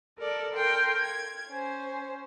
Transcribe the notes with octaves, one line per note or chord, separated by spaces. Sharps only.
A4 A#4 D5
A4 A#4 G5 C6
G#6
C#4 C5